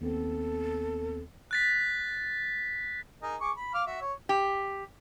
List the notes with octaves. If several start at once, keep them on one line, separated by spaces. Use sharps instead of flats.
D#2 B3 C4 A4
F#6 A6 B6
D#4 G#4 A#4
G#4 C#6 D6
B5
F5 D6 F6
F#4 E5
C#5
G4